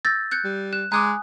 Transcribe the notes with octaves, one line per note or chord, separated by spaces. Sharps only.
E6 G6 A6 A#6
F#6 G6 C#7
G3
F#6 E7
G#3 G#5 A#5 D6 D#6 F#6